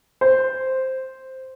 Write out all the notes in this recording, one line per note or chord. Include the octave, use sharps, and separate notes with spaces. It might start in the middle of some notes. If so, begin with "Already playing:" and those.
C5